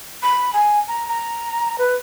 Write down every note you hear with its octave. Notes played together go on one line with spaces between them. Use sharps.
B5
G#5
A#5
A#5
B4